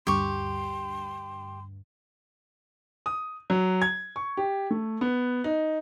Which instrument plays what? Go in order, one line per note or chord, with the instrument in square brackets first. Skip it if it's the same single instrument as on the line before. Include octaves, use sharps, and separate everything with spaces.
[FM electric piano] D2 G2 [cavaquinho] G4 C#6 [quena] C6
[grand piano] D#6
F#3
G#6
C#6
G4
A3
B3
D#4